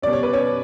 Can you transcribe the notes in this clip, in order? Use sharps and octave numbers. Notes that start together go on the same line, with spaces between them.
B2 G3 C#4 D5
C#5
B4
C#4 C#5